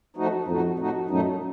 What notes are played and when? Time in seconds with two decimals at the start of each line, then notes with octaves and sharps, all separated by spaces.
0.17 F3 A3 D#4 F#4
0.47 F2 A2 A3 D#4 F#4
0.79 A2 A3 D#4 F#4
1.09 F#2 A#2 F#3 A3 D#4